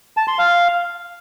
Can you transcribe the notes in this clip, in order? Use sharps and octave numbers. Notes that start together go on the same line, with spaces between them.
A5
C6
F5